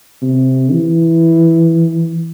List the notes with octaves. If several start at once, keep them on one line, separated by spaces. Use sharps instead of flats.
C3
E3